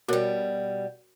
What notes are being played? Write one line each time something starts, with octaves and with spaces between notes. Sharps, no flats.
B2 G3 F#4 A#4 C#5